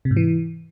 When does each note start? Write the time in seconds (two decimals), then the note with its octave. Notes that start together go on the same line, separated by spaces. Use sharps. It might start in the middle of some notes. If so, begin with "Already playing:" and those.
0.05 C3
0.11 G#2
0.17 E3